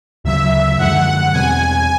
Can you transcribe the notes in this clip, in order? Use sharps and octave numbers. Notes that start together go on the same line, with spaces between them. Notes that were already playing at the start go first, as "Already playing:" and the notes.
D2 C#3 F#3 E5
F#2 D3 F3 G#3 F#5
E2 B2 G3 C4 G#5